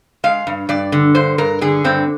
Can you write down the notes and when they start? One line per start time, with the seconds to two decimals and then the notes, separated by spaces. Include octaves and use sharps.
0.24 G#3 F5
0.47 G2
0.69 G2 D5
0.92 D3
1.15 G2 C5
1.38 G2 A#4
1.61 D3 G#4
1.84 G2 C4